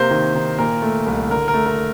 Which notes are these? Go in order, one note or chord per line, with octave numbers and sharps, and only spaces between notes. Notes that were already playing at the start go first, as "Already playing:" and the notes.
Already playing: C3 A#3 C5
D#3
D#3
A#2 A#4
A3
C2
D3 A#4
A#4
A3
A#4